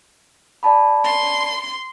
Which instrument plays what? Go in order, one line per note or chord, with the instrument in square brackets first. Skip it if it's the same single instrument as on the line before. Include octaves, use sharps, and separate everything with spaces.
[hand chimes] D5 A5 B5
[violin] C6